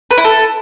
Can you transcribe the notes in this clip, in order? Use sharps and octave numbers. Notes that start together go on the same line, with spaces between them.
B4
E4
A4